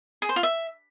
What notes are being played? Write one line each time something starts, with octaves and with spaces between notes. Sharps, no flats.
G#4
C5
F4
E5